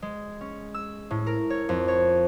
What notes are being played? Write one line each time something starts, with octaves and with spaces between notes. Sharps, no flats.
G#3
C#4
E6
A2
A#4
C#5
F2
C#5